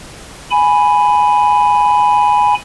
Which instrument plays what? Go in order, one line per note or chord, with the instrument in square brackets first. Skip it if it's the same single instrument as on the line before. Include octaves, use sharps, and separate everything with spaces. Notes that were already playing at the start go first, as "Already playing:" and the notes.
[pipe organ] G#5 B5